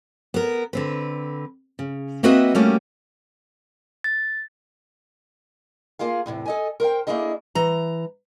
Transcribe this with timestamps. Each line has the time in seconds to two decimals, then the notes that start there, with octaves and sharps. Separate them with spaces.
0.34 B3 A#4
0.73 D3 C4 B4
1.79 C#3
2.23 A#3 C4 F#4 B4 D#5 E5
2.55 G3 A3 A#3 C#4 F#4 G4
4.04 A6
5.99 A#3 F4 G#4 F5
6.26 E2 A2 C3
6.46 A4 D#5 G#5
6.80 A#4 C5 F5 G5
7.07 A3 A#3 D4 E4 G#4 D#5
7.55 E3 A#5